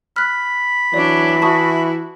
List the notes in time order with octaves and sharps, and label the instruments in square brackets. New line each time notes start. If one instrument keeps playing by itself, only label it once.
[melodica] B5 [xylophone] F6 F#6
[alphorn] E3 [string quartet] F#3 D4 [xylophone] D5
[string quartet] E4 F#4 [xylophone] A5 C#6 D#6